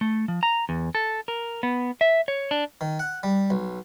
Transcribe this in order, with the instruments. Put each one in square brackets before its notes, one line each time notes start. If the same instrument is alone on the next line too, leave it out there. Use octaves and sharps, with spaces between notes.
[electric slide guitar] A3
F3
A#5
E2
A4
A#4
B3
E5
C#5
D4
[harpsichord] D#3
F#5
G3
B1